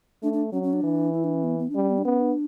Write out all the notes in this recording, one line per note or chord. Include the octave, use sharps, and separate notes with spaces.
A3 D4
D4
F#3 C#4
C#4
D4
E3
E4
D4
C#4
B3
B3
D4
G3 C#4
B3
D4
B3 C#4
D4